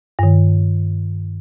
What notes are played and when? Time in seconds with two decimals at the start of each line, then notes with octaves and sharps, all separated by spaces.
0.19 G2 D#3